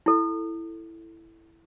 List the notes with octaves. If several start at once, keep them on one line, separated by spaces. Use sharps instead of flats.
E4 A4